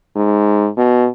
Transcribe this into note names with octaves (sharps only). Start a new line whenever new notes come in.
G#2
B2